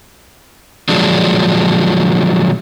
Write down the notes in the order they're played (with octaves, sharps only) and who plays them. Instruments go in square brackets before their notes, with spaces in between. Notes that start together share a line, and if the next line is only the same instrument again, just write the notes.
[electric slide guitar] A#2 D3 F3 F#3 G#3 D4